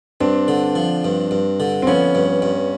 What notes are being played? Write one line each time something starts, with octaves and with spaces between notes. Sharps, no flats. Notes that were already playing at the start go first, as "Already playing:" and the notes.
G2 C4 D4
D3
F3
G2
G2
D3
C4
F3 B3 C#4
G2
G2